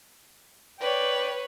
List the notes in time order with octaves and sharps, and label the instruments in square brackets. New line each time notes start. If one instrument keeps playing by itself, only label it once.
[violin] B4 C#5 [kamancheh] D5 G5